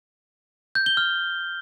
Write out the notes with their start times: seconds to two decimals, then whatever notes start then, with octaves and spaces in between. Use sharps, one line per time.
0.75 G6
0.86 G7
0.97 F6